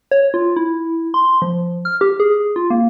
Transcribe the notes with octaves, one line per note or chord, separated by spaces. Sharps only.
C#5
F4
E4
C6
F3
F6
G4
G#4
F4
A#3